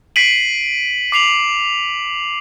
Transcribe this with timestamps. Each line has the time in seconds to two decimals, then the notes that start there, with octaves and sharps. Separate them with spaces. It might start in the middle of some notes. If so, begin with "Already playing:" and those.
0.16 B6 C7 D7 D#7 F#7
1.12 D6 C7 F7 F#7